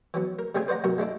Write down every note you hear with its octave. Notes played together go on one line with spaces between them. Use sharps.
E3 F#3 B3
A#4
C#3 G3 A3 C4 G#4 G#5
B4 C5 D5 F#5 A#5
B1 G2 F#4 A#4
G#3 A3 D4 E4